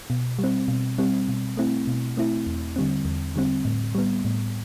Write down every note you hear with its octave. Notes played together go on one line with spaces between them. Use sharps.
B2
G3 C4
B2
G3 C4
B2
A3 C4 E4
B2
A3 C4 E4
E2
D3 G3 C4
E2
D3 G3 C4
A2
G3 B3
A2